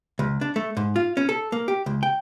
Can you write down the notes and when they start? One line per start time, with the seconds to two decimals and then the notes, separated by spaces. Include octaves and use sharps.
0.19 C#2
0.41 D4
0.56 A3
0.77 G#2
0.96 F4
1.17 C#4
1.29 A4
1.52 A#3
1.68 G4
1.86 C#2
2.03 G5